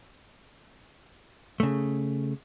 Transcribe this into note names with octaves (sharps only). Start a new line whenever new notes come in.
C#3 A3